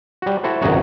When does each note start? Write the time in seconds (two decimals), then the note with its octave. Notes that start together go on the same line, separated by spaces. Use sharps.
0.22 G3 F#4
0.43 E4 F#4 A4 C5
0.61 G#1 C#2 F#2 D#4 F#4 C#5